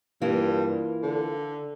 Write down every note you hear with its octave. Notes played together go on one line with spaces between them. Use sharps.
G2 E3 A#3 F4
D3